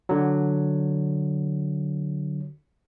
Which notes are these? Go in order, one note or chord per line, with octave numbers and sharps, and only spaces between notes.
D3 F#3